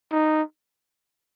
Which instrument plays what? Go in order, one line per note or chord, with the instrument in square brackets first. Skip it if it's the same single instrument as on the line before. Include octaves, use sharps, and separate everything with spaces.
[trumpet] D#4